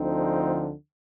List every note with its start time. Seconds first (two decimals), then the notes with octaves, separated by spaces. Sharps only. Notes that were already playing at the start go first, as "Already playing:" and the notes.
Already playing: D2 D3 F3 C4 D#4